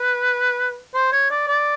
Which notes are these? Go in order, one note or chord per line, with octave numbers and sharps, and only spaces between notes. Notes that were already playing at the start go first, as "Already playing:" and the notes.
Already playing: B4
C5
C#5
D5
D5